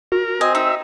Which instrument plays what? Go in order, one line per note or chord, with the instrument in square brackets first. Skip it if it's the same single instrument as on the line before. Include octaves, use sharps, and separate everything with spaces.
[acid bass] F#4 [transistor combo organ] A#4
[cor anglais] C4 [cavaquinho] D#5 G#5
[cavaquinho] D#4 [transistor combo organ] E5